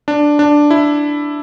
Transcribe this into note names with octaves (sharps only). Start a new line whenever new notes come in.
D4
D4
E4